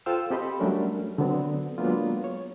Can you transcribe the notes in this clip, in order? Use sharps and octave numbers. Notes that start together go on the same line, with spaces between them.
F4 A4 C5 F5 G5 E6
C4 G4 A4 D#5 B5 C6
F#3 G3 A3 C#4 D4 A#4
D3 F#3 B3 C4
F#3 G#3 A#3 B3 D4 F4
C#5